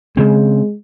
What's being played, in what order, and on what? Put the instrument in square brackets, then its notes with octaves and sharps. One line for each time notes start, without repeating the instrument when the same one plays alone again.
[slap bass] C#3 C4 [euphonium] G#3